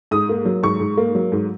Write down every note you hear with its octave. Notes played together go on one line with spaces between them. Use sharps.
G#2 D#6
A#3
F#3
G#2 C#6
G#2
A#3
F#3
G#2